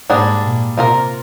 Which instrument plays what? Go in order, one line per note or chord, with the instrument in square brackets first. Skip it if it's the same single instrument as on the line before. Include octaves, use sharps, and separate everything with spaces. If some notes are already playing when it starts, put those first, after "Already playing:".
[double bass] G#2 [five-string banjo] G3 A#3 D4 G#4
[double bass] A#2
[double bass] C3 [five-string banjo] A#3 F4 A#4